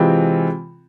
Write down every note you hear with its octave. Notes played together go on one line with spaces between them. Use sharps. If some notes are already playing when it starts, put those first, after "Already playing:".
Already playing: C3 E3 G#3 C4 F4